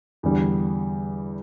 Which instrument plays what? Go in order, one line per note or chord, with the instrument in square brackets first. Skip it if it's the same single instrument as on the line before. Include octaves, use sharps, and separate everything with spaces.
[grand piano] E2 D3 G3